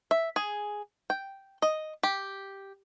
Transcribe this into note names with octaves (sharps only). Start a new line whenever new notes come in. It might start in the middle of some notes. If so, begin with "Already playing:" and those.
E5
G#4
G5
D#5
G4